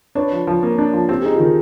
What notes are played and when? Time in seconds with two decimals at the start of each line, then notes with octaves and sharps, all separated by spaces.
0.15 D4 B4 C#5
0.32 F3
0.47 F3
0.63 A#3
0.78 D4
0.93 F3
1.09 C4 G4
1.22 D#4 G#4
1.33 F4 G4
1.40 D#3